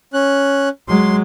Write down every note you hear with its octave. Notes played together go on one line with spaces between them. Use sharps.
C#4 F#6
F#3 G#3 C6